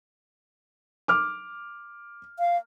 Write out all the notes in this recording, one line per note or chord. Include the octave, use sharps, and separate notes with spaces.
D6 F6
F5